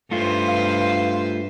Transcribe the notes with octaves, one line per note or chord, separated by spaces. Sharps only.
G2 A3 F4 B4 C5
F5